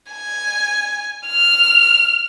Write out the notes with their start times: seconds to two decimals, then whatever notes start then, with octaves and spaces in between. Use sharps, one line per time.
0.12 G#5
1.26 F6